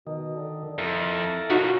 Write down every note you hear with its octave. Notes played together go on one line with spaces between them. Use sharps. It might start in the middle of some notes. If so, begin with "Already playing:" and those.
B2 D#3
D3
F2 E4 A4 A#4
F#2 B2 D#4 F4 F#4